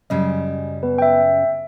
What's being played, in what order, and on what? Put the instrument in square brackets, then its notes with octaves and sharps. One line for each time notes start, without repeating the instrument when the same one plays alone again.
[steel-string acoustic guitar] F#2 C#3 G3 [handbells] D#5
[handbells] B3 B4
E5 G5